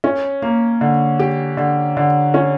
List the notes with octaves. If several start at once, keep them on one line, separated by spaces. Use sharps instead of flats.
C#4
A#3
D3
G4
D3
D3
C#4